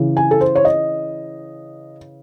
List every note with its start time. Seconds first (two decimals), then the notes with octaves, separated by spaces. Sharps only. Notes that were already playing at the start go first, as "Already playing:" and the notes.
Already playing: C#3 E3
0.17 G#5
0.31 A4
0.41 C5
0.55 C#5
0.65 D#5